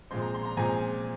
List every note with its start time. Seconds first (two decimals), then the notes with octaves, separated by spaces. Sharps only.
0.11 A#2 F3 G#3 C4 C6
0.22 A#5
0.34 C6
0.45 A#5
0.57 A#2 F3 G#3 C4 G#5